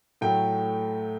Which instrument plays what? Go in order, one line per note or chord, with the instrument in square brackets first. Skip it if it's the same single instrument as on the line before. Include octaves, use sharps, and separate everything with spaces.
[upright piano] A2 F#3 A3 G5